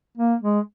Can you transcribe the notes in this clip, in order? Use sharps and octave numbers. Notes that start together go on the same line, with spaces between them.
A#3
G#3